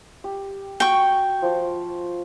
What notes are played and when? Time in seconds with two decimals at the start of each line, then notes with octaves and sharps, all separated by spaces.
0.24 G4
0.80 F#4 G5 C#6
1.42 F3 D6